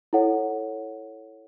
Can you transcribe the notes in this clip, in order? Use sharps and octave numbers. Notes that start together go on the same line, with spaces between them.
E4 A4 C#5 F#5